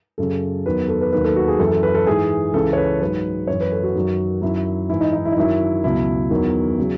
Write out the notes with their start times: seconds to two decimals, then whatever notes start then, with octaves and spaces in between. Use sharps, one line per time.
0.18 F#2 C#3 F#3 A4
0.66 E2 D#3 F#3 B4
0.88 A4
1.01 B4
1.12 D#2 D#3 F#3 B4
1.24 A4
1.36 F#4
1.48 G#4
1.59 F#2 E3 A4
1.72 A4
1.83 B4
1.94 A4
2.07 G#2 E3 G#4
2.54 C#2 C#3 E3 A4
2.73 C#5
2.77 B4
3.01 G#2 F#3 B4
3.47 F#2 E3 C#5
3.60 B4
3.72 A4
3.83 F#4
3.95 F#2 D#3 F#3
4.42 F#2 D#3 F#3 E4
4.89 G#2 E3 E4
5.01 D#4
5.12 D#4
5.25 E4
5.32 D#4
5.37 F#2 D#3 F#3 E4
5.84 C#2 B2 F#3 E4
6.31 E2 D#3 F#3
6.79 C#3 F#3